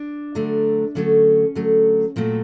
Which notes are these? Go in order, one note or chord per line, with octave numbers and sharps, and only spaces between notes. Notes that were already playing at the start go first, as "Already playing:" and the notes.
Already playing: D4
D3 F#3 A3
D3 F#3 A3 C#4
D3 F#3 A3
A#2 F#3 A3 C4